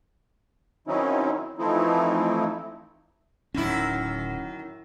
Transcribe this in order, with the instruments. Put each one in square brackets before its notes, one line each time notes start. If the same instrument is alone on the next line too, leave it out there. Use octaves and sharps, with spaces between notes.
[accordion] D#3 F#3 C4 C#4 D#4 E4
E3 F3 A3 C4 D#4 E4
[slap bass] D1 C#4 [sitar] F#2 D#3 E4